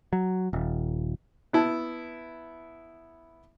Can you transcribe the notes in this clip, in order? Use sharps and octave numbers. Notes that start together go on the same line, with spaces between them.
F#3
D#1
B3 E4 A5